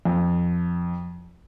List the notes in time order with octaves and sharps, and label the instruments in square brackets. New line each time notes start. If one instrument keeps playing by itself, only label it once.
[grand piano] F2